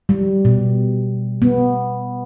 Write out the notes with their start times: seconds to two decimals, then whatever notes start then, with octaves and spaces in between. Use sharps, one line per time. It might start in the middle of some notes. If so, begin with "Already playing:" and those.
0.09 G3
0.45 B2
1.42 B3